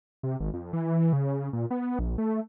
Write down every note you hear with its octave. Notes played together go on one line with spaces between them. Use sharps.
C3
G#1
F2
E3
C#3
A#2
B3
A#1
A3